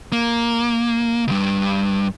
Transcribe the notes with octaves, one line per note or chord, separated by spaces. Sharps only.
A#3
C#2 G2